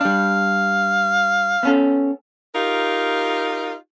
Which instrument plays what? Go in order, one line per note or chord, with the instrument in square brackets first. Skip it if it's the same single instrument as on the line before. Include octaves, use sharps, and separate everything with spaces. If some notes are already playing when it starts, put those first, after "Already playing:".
[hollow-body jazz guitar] G3 D4 [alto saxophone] F5
[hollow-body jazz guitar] B3 C#4 A4
[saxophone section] D#4 F4 G4 A#4